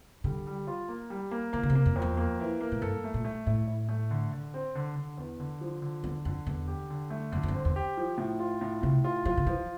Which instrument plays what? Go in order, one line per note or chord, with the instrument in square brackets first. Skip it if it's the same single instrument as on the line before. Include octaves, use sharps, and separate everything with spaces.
[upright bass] D3 [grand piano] G3
[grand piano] G3
F4
A#3
G3
A#3
[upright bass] E3 [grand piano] A#3
[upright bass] D3
C3
[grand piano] A#3
[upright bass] F2
[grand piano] F2
[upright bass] E2
[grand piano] A#3
E3
A#3
[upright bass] A2
[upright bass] G2 [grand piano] A4
[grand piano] A3
[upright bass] A#2
[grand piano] A3
[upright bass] A2 [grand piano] E4
[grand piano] E4
A3
D3
D3
C4
D3
D3
E2
D3
F3
D3
[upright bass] E2 [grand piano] D3
[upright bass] F2 [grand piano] D3
[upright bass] E2 [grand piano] D3
[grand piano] G4
D3
A3
[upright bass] F2 [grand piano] D3
[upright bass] F2
G2
[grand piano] C4
[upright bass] E2
[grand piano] G4
F3
A2
F4
A2
[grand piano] A2 [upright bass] C3
[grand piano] F4
[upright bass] F3 [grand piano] F4
[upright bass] D3
[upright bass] E3 [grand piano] F3